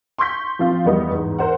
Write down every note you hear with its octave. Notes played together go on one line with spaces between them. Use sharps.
C6 C#6 G6 B6
F3 C4 F4
E2 G3 B3 D#5
E2 G#2
A#4 C5 F#5